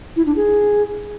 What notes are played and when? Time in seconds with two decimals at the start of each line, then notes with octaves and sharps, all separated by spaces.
0.16 E4
0.26 D4
0.36 G#4